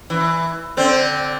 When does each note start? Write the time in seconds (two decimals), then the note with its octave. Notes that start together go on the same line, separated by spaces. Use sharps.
0.10 E3
0.77 D3 C4